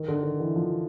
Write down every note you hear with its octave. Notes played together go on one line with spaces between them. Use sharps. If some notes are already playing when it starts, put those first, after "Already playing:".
Already playing: D#3
D3
D#3
E3
F3